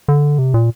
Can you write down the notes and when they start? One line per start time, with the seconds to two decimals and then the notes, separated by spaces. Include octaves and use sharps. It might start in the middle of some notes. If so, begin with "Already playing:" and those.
0.08 D3
0.39 C3
0.54 A#2